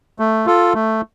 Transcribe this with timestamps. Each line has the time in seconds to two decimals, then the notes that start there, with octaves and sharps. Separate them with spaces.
0.19 A3
0.46 F4 A4
0.74 A3